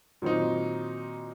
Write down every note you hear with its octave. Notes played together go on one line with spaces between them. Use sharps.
A#2 D#3 F#3 C4 D#4